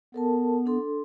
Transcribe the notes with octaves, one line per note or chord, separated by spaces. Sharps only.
B3 A4 A#4 A5
D4 A4 C6